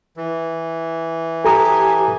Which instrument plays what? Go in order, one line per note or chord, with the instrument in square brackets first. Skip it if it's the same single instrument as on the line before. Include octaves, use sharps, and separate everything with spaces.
[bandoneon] E3
[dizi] G4 [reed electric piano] A4 A#5 D#6 [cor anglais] G#5